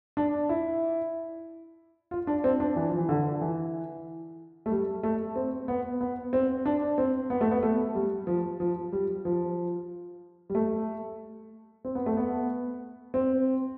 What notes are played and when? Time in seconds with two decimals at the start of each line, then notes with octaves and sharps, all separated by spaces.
0.17 D4
0.49 E4
2.11 F4
2.27 D4
2.44 C4
2.60 D4
2.76 E3
2.89 F3
2.98 E3
3.09 D3
3.41 E3
4.66 A3
4.71 G3
5.03 A3
5.36 C4
5.68 B3
6.01 B3
6.33 C4
6.66 D4
6.98 C4
7.30 B3
7.41 A3
7.51 B3
7.63 A3
7.95 G3
8.27 F3
8.60 F3
8.92 G3
9.25 F3
10.50 G3
10.55 A3
11.85 C4
11.95 B3
12.06 A3
12.17 B3
13.14 C4